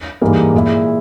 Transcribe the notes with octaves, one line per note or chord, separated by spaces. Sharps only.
G#2 E3 G3 A#3
A#2 G#3 E4